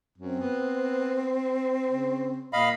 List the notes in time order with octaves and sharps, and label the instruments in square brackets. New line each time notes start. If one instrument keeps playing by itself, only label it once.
[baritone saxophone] F#2 [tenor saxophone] C4
[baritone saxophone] B3
C#3
[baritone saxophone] A#2 [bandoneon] D#5 F5 B5